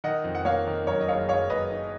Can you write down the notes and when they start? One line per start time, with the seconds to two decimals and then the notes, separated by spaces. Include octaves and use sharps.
0.04 D#3 D#5 F#5
0.24 F2
0.35 F#5
0.45 A#3 C#5 F5
0.67 D#3
0.87 F#2 A#4 C#5
1.01 D#5
1.08 F#1 C#5 F5
1.29 F#1 C#5 F5
1.50 F#1 B4 D#5
1.71 D#4